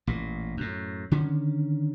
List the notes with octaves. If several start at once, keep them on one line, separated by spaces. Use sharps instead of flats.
A1 A#2
F#2 A2
D3 D#3 C#4